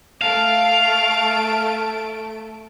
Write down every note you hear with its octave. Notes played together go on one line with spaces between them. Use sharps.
A3 F5 A5 D7